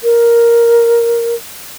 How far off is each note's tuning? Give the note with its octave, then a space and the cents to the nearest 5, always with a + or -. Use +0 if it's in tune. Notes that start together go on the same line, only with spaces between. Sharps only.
A#4 +5